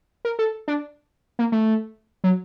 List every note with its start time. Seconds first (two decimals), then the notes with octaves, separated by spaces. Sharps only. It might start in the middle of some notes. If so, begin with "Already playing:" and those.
0.25 A#4
0.39 A4
0.68 D4
1.39 A#3
1.52 A3
2.24 F#3